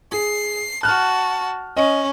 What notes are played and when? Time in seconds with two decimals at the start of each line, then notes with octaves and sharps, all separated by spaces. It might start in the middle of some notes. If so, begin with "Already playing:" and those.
0.12 G#4 C7
0.83 F#4 A5 F6 F#6
1.77 C#4 D#5